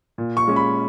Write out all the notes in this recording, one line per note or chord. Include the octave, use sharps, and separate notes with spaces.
A#2
C#6
G#3 C#4
B5